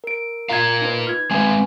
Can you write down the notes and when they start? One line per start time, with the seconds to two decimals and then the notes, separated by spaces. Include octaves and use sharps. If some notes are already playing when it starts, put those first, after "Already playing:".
0.04 A#4 D7
0.49 F4 A#4 F5 A#5 G#6
0.81 D#4 B4
1.07 F6 G#6
1.31 G#3 C4 B4 G#5